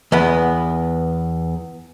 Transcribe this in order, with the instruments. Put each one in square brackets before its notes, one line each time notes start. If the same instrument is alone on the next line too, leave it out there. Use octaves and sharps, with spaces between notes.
[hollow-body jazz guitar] E2 B3